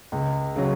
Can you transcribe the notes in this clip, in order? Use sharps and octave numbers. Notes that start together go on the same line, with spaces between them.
C#2
C#3 F#3